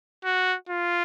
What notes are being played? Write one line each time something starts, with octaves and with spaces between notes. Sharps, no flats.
F#4
F4